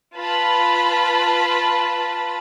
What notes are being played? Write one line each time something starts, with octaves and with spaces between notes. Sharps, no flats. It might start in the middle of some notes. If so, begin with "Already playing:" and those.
F4 B4 A5 B5